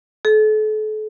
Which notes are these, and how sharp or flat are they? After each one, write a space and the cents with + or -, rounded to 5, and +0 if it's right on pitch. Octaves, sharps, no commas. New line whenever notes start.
A4 -40